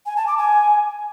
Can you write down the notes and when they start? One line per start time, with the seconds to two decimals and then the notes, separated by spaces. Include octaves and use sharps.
0.06 G#5
0.17 A5
0.27 D6
0.38 G#5